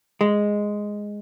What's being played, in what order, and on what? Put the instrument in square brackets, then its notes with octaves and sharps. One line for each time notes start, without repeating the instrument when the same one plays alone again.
[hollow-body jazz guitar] G#3